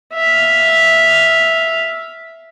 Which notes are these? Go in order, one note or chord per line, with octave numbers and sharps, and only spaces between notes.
E5 F5